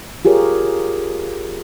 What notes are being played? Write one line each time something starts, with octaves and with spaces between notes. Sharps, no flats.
F4 G4 G#4 A#4 C#5